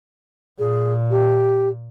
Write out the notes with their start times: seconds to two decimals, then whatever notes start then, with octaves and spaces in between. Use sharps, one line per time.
0.59 A#2 G#4
1.11 G4